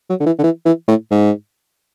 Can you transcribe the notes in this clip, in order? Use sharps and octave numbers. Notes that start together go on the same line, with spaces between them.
F#3
D3
E3
D3
E3
E3
A2
G#2